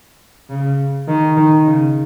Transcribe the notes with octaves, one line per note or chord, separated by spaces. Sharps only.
C#3
D#3
D#3
C#3